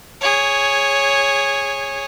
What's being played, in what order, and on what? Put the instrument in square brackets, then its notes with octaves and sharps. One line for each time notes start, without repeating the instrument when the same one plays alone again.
[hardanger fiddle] G#4 C#5